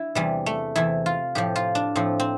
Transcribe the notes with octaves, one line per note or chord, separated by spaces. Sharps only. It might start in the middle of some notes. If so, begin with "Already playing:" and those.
Already playing: D4 E4
E2 C3 E3 G3
A3
E2 C3 E3 E4
F4
A2 F3 G4
F4
D4
A2 F3 C4
C4